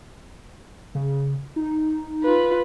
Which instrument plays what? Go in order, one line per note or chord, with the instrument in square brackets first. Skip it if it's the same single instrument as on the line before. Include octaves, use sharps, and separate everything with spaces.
[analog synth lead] C#3
D#4
[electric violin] F4 B4